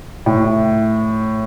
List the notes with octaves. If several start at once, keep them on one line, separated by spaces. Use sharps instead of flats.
A2